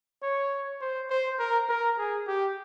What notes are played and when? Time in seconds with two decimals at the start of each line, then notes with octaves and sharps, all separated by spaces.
0.22 C#5
0.81 C5
1.10 C5
1.39 A#4
1.69 A#4
1.98 G#4
2.28 G4